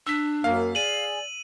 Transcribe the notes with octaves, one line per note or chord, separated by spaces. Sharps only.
D4 E6 B6
F#2 A#3 F5
G#4 D5 D#7 F#7